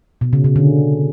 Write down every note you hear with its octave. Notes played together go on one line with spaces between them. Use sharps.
B2
C#3
C#3
D3